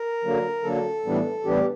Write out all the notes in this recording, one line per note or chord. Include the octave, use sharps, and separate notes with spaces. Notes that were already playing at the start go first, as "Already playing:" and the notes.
Already playing: A#4
D3 F#3 A#3
D3 F#3 A#3 A4
A2 E3 G3 B3 D4
A2 E3 G3 B3 D4 G4